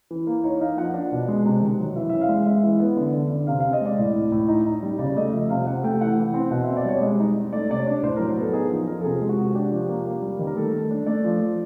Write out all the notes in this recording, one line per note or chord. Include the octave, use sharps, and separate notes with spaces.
E3
A#3
D#4 C#5
D#4 F5
F3 F#5
D4
B2
G#3
C3
D#3
F#3
E3 E5
C#4 E5
F5
G#3
G#3 E5
E3
B3
D3
D3
D3
C3 F5
C4 F5
D#5
G#3 D5
A2
A2
A2
D#4
D#4
G3
C#3 D5
A3 D#5
F3 E5
C3 F5
C3 F#5
A3 G5
E3 F#5
E3
C4
B2 F#5
E5
C4
D5
G3 C#5
G#3 D#5
D#4
D#4
A3 D5
C3 D5
C#5
D4
A2 C5
F#3 A#4
A#4
B3 A4
D#4 G#4
F3
F3 A#4
A4
C3 G#4
G#3
F#4
C3
D4 G4
F3
A#3
A#3
G3
D#3
A#4
A3 A4
A3
D4
A3 D5
F3
F3